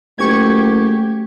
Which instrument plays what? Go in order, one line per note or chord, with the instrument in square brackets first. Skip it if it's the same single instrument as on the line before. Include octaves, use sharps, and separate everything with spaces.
[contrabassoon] F#1 [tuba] A3 [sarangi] G4 [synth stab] C#6 G#6